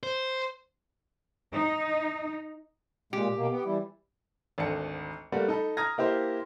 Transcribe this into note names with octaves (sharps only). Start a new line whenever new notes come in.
C5
D#4
A#2 G#3 G4
B2 A#3
B3
E3 G3 E4
G#1 D2 A4 C#7
G3 A3 A#3 B4 F#5
D#4 A4 B5
A#5 D#6 F6 G#6 A#6
A#3 E4 G4 C5